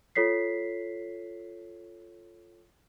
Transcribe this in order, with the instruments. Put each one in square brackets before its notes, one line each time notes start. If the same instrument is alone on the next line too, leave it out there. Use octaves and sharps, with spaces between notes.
[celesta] F4 A4 C#5 B6 C7